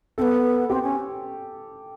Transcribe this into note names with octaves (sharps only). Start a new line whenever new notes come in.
B3 C4 A4
C4 G4
C#4